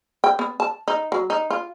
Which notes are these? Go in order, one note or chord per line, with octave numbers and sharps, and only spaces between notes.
G5
B3
A5
D#4
F#3
D#4
F4